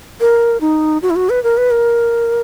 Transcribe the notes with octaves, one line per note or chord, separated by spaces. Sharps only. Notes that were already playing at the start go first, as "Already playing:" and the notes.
A#4
D#4
F#4
E4
F#4
B4
A#4
B4
A#4